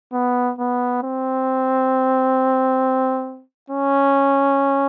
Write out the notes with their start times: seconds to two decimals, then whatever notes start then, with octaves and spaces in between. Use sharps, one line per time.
0.13 B3
0.59 B3
1.03 C4
3.70 C#4